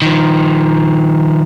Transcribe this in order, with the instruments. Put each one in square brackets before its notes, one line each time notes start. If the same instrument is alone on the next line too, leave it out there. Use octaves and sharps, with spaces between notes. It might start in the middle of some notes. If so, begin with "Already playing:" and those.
[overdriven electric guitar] D#3 F3